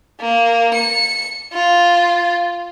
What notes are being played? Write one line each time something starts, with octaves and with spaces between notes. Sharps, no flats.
A#3
C#7
F4